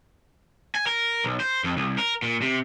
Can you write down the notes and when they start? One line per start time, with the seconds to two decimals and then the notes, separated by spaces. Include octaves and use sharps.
0.75 G#5
0.87 A#4
1.24 B1
1.40 C5
1.64 F2
1.77 C2
1.98 A#4
2.22 A#2
2.42 C3